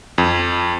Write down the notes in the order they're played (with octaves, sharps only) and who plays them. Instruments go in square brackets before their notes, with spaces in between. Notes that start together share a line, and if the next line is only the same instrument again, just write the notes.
[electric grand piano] F2